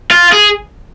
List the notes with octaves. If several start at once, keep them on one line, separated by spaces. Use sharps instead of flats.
F4
G#4